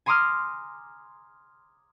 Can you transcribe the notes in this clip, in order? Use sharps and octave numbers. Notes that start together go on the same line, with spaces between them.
G#5 A#5 C6 D6 D#6 F6